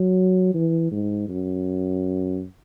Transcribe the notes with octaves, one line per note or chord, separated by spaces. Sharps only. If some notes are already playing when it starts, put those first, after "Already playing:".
Already playing: F#3
E3
G#2
F#2